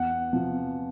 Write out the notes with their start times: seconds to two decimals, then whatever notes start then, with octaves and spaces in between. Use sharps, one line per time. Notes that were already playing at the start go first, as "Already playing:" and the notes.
Already playing: E2 F#5
0.32 C3 F3